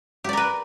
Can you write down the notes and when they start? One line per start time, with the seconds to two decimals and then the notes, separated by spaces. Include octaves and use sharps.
0.24 G4
0.29 D5
0.33 A#4
0.37 B4